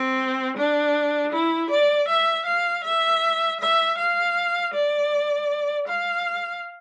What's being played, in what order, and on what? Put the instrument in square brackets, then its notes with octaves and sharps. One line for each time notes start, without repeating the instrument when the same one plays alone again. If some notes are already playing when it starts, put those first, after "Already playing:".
Already playing: [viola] C4
D4
E4
D5
E5
F5
E5
E5
F5
D5
F5